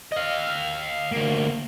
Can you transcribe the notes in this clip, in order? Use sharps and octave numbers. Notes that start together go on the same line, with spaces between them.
D#5 F5
D2 A#3